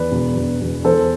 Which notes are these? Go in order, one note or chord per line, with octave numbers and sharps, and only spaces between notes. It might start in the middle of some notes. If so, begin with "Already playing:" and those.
Already playing: E2 B4 D5
E1
E1
E1
E2 A4 C5